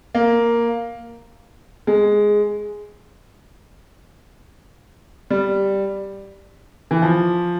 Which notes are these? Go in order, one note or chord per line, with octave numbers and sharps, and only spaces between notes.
A#3
G#3
G3
E3
F3